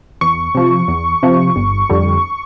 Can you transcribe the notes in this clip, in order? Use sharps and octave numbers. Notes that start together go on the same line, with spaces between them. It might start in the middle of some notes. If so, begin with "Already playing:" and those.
E2 C#6
C3 F3
E2
C3 F3
G1
F2 D3 G3